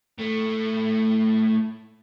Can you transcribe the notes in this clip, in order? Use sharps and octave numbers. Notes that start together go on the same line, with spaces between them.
A2 A3